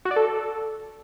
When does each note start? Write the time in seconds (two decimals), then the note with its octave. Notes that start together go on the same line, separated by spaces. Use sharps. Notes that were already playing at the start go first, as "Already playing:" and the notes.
0.05 F#4
0.11 D5
0.16 A4